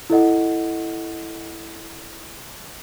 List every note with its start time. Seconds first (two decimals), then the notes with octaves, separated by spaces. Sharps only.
0.10 E4 A4 D#5 F#5